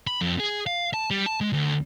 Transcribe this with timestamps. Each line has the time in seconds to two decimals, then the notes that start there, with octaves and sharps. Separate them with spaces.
0.07 B5
0.21 F2
0.40 G#4
0.67 F5
0.94 A5
1.11 G3
1.26 A5
1.41 G#3
1.53 D2